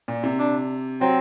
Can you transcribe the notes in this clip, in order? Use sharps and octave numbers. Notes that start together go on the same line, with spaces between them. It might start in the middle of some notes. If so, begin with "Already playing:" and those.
A#2
C3
D4
F#3 C4